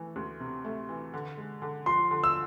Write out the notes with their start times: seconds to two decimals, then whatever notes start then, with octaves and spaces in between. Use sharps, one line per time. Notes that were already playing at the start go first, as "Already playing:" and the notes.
Already playing: E3 A3
0.16 D2
0.40 C3
0.65 A3
0.89 E3
1.14 D3
1.37 G#3
1.62 D3
1.86 F3 C6
2.11 D3
2.24 E6